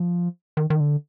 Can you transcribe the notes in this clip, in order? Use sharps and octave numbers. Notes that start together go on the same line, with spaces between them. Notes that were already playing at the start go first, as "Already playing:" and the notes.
Already playing: F3
D#3
D#3
D3